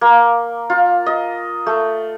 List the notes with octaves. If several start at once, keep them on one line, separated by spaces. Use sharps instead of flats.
A#3
F4
D#5
A3